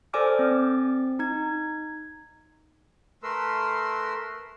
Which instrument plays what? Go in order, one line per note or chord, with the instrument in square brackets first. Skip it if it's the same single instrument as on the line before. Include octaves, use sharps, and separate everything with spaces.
[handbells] A4 C5 D5 G#5 D6 F6
C4
D#4 G#6
[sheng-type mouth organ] A3 A#4 B4 C6 E6